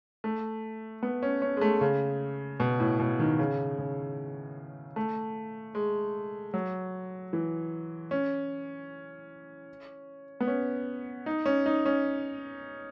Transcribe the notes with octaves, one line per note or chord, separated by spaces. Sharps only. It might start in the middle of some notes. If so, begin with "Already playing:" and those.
A3
B3
C#4
C#4
G#3
A3
C#3
B2
A2
B2
D#3
C#3
C#3
A3
G#3
F#3
E3
C#4
B3
C#4
D#4
C#4
D#4
C#4